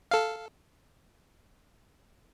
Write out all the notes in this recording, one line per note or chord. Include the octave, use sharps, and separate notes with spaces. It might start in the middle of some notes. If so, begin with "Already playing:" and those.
A4 F5